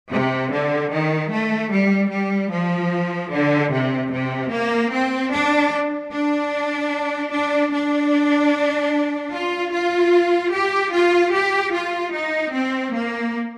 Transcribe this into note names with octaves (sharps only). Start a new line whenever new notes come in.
C3
D3
D#3
A3
G3
G3
F3
D3
C3
C3
A#3
C4
D4
D4
D4
D4
F4
F4
G4
F4
G4
F4
D#4
C4
A#3